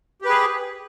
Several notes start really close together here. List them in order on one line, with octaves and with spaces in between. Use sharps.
G4 B4 G#4